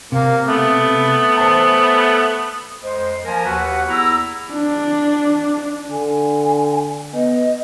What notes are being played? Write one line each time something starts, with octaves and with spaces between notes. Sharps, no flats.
C3 A#3
A3 B3
C5 G#5 A5
F2 G#3 C5
F3 A#3 A#4 G#5
D#2 F#4 B4 F#5
E2 B3 E4 A#5 E6
D4
D3 G#5
B3 D#5